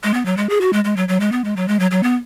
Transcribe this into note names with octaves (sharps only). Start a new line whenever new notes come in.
G#3
B3
F#3
G#3
G#4
F#4
G#3
G#3
F#3
F#3
G#3
B3
G#3
F#3
G#3
F#3
F#3
B3